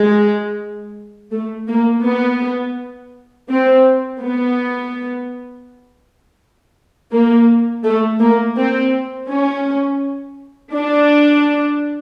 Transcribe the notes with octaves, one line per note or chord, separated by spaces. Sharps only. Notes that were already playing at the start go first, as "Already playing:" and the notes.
Already playing: G#3
A3
A#3
B3
C4
B3
A#3
A3
A#3
C4
C#4
D4